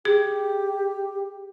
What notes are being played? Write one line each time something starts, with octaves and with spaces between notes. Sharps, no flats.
G4 G#4